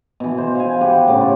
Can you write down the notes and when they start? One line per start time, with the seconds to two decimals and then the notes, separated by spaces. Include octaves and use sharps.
0.20 B2 E3
0.38 C5
0.55 F5 G#5
0.81 G4 B4 F#5
1.08 A2 C#3 D6
1.21 F4